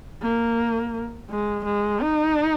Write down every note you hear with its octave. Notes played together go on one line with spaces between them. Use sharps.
A#3
G#3
G#3
D#4